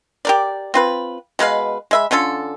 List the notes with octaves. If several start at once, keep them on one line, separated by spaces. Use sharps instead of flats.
G4 A#4 D5
C4 F4 B4
B2 G#3 B4 F5
G#3 E5 B5
D3 C#4 F4 A4